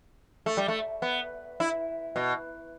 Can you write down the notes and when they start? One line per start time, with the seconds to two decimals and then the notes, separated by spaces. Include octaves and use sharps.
0.46 A3
0.57 G3
0.68 A3
1.02 B3
1.60 E4
2.16 B2